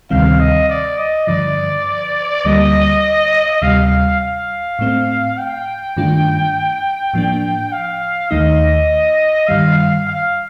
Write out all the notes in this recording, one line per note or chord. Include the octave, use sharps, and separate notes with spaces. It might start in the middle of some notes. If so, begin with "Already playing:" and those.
D2 C3 D#3 G3 C4 F5
D#5
D5
D#5
G2 D3 F3 D5
D2 D3 G3 A#3 D#5
D2 C3 G3 F5
F5
A2 A3 C4
G5
G2 D#3 A3 D4 F4
A2 F3 A#3 D4
F5
D#2 D#3 A3 D#4 D#5
G2 D#3 G3 F5
F5
F5